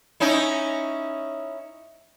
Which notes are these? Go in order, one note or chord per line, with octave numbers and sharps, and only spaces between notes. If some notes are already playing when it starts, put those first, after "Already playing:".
C#4 D#4 E4